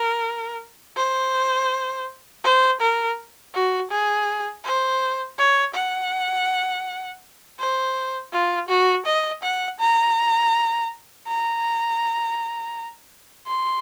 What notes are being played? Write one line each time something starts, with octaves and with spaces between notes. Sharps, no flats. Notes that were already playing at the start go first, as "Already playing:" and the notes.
Already playing: A#4
C5
C5
A#4
F#4
G#4
C5
C#5
F#5
C5
F4
F#4
D#5
F#5
A#5
A#5
C6